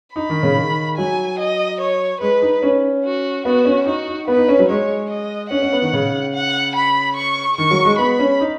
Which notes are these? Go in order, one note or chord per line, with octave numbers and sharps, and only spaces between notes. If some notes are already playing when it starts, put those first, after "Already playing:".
D#4 B5
D#3
C#3
D#3
F#3 G#5
D#5
C#5
G#3 B4
D#4
C#4
F#4
B3 F#4
C#4
D#4 F#4
D#4
B3 B4
D#4
C#4
F#3
G#3 C#5
D#5
C#4 F#5
C#4
B3
D#3
C#3
F#5
B5
C#6
D#3 C#6
F#3
G#3
B3 B5
C#4
D#4